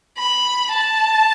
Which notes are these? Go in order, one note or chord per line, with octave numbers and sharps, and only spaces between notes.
B5
A5